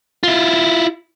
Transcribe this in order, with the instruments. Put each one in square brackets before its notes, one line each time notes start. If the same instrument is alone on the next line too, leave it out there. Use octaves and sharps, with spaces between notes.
[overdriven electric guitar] E4 F4